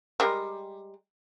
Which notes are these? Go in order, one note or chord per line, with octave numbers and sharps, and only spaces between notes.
G3 G#3 A#4